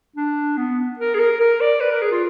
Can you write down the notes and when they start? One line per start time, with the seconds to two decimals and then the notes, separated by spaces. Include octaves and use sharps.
0.16 D4
0.57 B3
0.99 A#4
1.14 G#4
1.19 A#4
1.40 A#4
1.61 D5
1.80 B4
1.91 A#4
2.01 G#4
2.11 F4